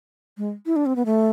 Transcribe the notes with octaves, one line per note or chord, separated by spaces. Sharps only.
G#3
E4
D4
C4
B3
A3